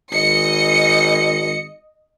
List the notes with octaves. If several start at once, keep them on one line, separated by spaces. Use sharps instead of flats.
G#1 D#5 C#7